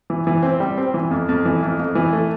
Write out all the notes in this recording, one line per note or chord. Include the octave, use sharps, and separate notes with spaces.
E3
E3
C4
G3
C4
E3
F2
F2
E3
F2
F2
E3
A3